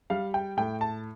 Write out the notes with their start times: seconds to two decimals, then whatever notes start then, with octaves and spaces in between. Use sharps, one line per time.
0.10 G3 F5
0.34 G5
0.57 A2 G5
0.81 A5